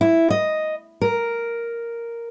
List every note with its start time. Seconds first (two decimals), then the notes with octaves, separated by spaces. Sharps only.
0.01 E4
0.30 D#5
1.02 A#4